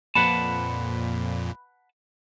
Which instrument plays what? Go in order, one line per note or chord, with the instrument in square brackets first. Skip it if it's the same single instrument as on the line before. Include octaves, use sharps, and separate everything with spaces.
[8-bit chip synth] F2 A#2 [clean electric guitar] B4 F#5 A5 [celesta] B5 F#6